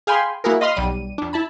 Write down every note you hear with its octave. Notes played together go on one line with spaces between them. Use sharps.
G#4 F5 G5 G#5 B5 C6
A#3 E4 F#4 G#4 A#4
D#5 F5 B5 C6 D#6 F6
B1 G3 D#7
F2 D4
E4 A5 B5